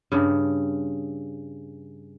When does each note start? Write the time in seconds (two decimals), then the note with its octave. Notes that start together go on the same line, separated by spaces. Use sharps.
0.12 G2 C#3